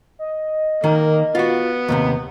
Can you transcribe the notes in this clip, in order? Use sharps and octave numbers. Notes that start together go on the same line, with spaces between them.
D#5
D#3 A#3
B3 F4 F#4
D#2 A2 C3